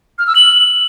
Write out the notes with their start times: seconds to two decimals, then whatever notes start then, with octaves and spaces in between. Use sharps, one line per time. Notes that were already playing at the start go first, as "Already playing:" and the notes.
0.19 F6
0.27 E6
0.35 F#7